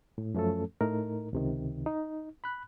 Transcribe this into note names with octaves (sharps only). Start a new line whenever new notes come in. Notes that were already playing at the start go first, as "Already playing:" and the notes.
A2
F#2 F3 A3 C#4 A4
A2 A3 D#4 A#4
C#2 C3 D#3
D#4
B5 F#6